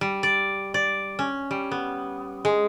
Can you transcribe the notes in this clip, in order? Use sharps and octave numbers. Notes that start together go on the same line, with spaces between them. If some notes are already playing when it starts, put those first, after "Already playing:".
G3
D5
D5
C#4
G3
B3
G#3